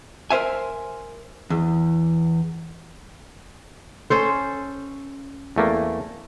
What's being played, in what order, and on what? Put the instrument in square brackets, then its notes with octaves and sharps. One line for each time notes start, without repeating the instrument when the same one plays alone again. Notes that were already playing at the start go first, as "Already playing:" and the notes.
[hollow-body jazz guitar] A#4 C5 E5 G#5
E2
[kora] C#4 A4 C5
[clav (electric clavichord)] E2 A3 A#3